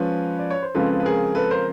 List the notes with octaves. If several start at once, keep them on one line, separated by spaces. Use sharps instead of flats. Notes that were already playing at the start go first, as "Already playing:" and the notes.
Already playing: F3 G#3 C#4 F4 B4 C#5
D5
C#5
C5
C#3 F3 G#3 C4 F4 A4 B4
B4
G#4 A#4
A4 B4
A#4 C5